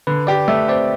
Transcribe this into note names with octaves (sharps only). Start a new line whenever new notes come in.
D3 B4
G4 D5
A3 E5
C4 D5